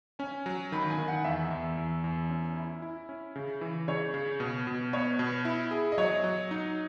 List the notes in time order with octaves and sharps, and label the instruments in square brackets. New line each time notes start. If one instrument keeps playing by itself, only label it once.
[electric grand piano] C#4 [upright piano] G#5
[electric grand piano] F#3
[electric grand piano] D#3 [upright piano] B5
[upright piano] G#5
[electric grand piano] D#3
[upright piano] F#5
[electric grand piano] E2 [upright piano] E5
[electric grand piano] E2
E2
E2
C#4
E4
E4
C#4
C#3
E3
[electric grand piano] C#3 [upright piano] C#5
[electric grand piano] C#3
B2
B2
[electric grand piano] B3 [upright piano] C#5
[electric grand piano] B2
E4
G#4
[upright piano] D#5
[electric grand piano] F#3 [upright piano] C#5
[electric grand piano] F#3
D#4